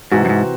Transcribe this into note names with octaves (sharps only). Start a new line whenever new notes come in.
G#2 C3 E3 C4 F#4
F#2
G#2